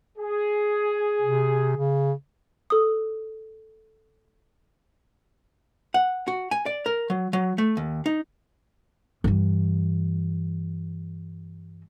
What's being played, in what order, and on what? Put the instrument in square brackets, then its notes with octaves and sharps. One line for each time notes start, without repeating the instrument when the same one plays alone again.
[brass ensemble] G#4
[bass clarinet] C3
C#3
[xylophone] A4 D#6
[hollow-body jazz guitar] F#5
F#4
G#5
D5
A#4
F#3
F#3
A3
D#2
D#4
[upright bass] G2 E3